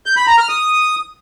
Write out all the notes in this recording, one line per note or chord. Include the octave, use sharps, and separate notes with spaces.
G6
B5
A#5
F6
D#6